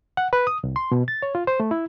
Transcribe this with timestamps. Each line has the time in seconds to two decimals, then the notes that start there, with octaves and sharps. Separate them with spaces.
0.17 F#5
0.33 B4
0.47 D#6
0.64 C2
0.76 C6
0.92 B2
1.08 A6
1.22 C#5
1.35 F4
1.47 C5
1.60 A3
1.71 E4